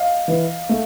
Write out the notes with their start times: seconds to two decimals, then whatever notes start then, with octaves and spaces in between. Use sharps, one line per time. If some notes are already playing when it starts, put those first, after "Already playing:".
Already playing: D#5 F5
0.28 E3
0.69 A3